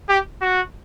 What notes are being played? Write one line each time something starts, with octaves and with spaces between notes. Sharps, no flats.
G4
F#4